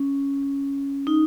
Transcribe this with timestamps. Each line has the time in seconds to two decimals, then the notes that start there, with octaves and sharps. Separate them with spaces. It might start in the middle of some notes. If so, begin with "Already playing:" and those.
Already playing: C#4
1.07 D#4